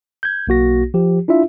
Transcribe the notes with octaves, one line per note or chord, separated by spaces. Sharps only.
G6 G#6
B1 A#3 F#4 A#6
F3 G4
D4 E4 F4 E5